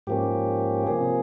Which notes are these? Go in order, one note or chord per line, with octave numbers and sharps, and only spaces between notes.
G#2 F3 A#3 C#4 G4
C3 F3 A#3 G#4